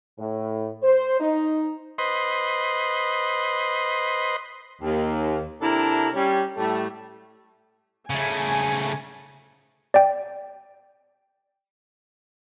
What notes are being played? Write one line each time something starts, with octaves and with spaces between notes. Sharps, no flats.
A2
C5
D#4
B4 C5 D#5 C6
D#2
C3 D4 E4 A4 A#4
G3 C#4
A2 G3 A3
C#3 A3 G#5
D5 G5